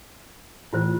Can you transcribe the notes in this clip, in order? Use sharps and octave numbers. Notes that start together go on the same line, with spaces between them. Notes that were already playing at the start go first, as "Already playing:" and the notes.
A2 E3 A3 E4 F4 C5